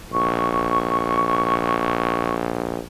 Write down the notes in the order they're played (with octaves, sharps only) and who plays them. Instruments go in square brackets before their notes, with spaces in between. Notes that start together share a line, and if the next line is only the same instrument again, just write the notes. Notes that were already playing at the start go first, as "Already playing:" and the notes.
[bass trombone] A#1 [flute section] C#6